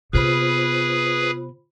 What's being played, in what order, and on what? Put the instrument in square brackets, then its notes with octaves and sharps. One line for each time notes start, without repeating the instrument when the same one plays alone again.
[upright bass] C3 B3 [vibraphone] F4 C5 B5 [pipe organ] G#4 B4